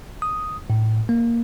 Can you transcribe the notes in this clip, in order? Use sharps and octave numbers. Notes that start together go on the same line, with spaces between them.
D#6
A2
A#3